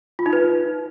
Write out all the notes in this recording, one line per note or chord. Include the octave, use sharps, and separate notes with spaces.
F4
D#4
B4